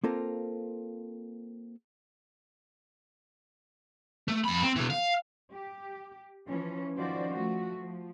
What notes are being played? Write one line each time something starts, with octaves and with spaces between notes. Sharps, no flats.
A#3 C4 F4 A4 A#4
A3
F2 B5
C4
B2 E3
F5
G4
E3 F3 C#4
D#3 F3 C#4 F#4 C5 D5
F3 A3 F#4
F3